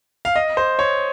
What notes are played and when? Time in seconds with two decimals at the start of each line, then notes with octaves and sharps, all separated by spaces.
0.25 F5
0.36 D#5
0.57 C5
0.79 C#5